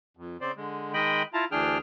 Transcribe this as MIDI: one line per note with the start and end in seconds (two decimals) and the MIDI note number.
0.17 0.37 41
0.41 0.52 49
0.41 0.52 60
0.41 0.52 72
0.41 0.52 74
0.57 0.94 50
0.57 0.94 56
0.94 1.23 51
0.94 1.23 56
0.94 1.23 75
0.94 1.23 79
0.94 1.23 83
1.34 1.45 64
1.34 1.45 65
1.34 1.45 81
1.34 1.45 82
1.52 1.78 38
1.52 1.78 52
1.52 1.78 62
1.52 1.78 68
1.52 1.78 79
1.52 1.78 89